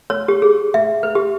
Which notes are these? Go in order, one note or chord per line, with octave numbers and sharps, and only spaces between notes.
C#5
G4
G#4
E5
B4
G4